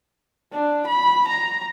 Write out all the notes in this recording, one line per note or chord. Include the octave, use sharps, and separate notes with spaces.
D4
B5
A#5